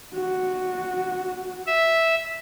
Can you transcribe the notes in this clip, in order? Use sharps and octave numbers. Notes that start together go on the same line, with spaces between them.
F#4
E5